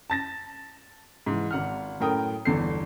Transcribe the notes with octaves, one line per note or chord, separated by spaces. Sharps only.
A5 A6 A#6
G#2 E3
G#1 F#5 F6
F#2 A2 A#4 G5 D#6
G1 E2 A4 C7